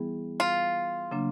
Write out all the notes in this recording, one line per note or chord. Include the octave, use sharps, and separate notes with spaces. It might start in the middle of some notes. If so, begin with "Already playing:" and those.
Already playing: E3 G3 B3 E4 G#4
F4
C#3 F#3 A#3 D4